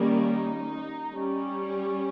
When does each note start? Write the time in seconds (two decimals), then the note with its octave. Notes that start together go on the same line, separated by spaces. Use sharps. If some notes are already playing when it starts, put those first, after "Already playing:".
Already playing: D#3 G3 A#3 C#4
0.20 D#4
1.12 G3 C#4